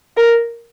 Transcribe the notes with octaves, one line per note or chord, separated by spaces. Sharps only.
A#4